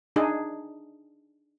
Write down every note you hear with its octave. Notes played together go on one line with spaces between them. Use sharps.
D4 D#4 G#4